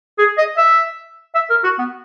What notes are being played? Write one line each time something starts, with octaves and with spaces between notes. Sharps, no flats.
G#4
D#5
E5
E5
A#4
F#4
B3